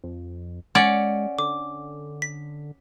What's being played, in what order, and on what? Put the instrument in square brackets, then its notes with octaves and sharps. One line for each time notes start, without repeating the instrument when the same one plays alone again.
[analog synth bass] F2
[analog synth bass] G#3 [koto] C#4 D5 [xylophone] F#5
[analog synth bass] D3 [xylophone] D6
[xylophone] B6